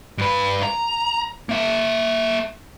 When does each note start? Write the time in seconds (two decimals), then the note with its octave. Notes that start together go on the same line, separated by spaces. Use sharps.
0.18 G2 B4
0.63 A#5
1.49 A#3 E5